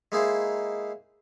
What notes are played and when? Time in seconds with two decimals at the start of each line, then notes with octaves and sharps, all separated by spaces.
0.12 G#3 A#3 D#4 E4 G#4 C5